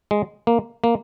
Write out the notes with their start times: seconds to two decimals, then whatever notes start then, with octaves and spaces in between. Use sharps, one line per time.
0.11 G#3
0.47 A#3
0.84 A#3